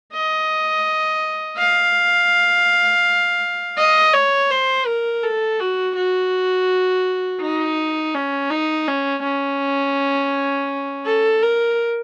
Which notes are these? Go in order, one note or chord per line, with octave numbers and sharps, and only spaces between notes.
D#5
F5
D#5
C#5
C5
A#4
A4
F#4
F#4
D#4
C#4
D#4
C#4
C#4
A4
A#4